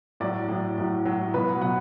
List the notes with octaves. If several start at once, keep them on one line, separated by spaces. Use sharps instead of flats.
A2 F#3 D5
A2 F#3
A2 F#3
A2 F#3
B2 F#3 B4
F#5
B2 F#3 F#5